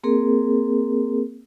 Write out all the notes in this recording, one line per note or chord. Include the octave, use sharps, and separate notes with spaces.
A#3 C4 G#4 A#4